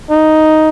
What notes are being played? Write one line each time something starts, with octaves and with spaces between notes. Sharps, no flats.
D#4